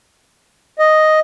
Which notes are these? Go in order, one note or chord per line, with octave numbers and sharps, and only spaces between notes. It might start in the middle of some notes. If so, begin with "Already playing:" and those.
D#5